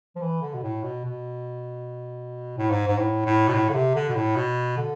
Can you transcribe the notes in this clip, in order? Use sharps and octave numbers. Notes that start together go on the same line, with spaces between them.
F3
E3
D3
B2
A2
B2
B2
A2
G#2
G#2
A2
A2
B2
A2
D3
C3
D3
B2
A2
B2
D3